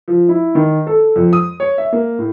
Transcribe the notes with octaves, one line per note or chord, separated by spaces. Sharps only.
F3
E4
D#3
A4
F2
D#6
C#5
E5
A#3
A2